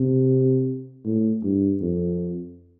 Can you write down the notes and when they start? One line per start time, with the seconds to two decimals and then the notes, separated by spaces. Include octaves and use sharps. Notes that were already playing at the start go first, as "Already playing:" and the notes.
Already playing: C3
1.05 A2
1.43 G2
1.81 F2